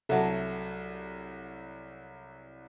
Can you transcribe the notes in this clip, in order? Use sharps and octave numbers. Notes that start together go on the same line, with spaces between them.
C2 F#3 A4 E5 F#5 A5